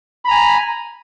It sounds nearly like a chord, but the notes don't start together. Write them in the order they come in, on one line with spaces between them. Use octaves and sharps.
B5 A#5 G#5